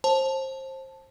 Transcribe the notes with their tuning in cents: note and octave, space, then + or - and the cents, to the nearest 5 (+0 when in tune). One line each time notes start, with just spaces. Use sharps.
C5 +25 A5 +0